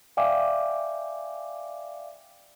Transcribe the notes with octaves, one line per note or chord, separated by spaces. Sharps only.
D5 E5 F5 G5 G#5 D6